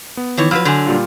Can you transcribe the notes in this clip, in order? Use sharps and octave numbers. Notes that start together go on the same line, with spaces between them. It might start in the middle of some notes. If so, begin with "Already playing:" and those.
B3
D#3 E3 C#5
F3 F#3 B4 B5 E6 F6
D3 F#3 G#5 C6 G6
A#2 G3 F4